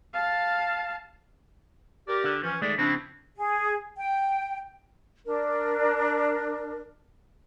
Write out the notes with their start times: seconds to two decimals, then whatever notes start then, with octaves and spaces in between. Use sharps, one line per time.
0.14 F5 A5
2.08 G4 A#4 D5
2.24 D3
2.43 E3 F3 C#4
2.62 D#3 G#3 A3 D5
2.78 C#3 F3 C4 D4 E4
3.37 G#4
3.97 G5
5.26 D4 A#4